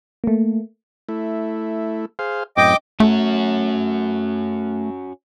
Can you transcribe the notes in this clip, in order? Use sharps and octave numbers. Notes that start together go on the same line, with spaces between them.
A3 A#3
A3 E4
G#4 C5 F5
F#2 A2 C4 D#5 G5 D6
A3 C#4 F#4